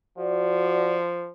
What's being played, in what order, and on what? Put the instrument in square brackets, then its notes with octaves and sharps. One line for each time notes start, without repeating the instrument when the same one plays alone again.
[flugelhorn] F3 [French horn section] F#4 D5